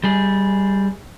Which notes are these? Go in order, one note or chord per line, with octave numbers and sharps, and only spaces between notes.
G3 G#4